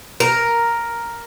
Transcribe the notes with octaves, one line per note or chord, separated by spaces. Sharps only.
A#4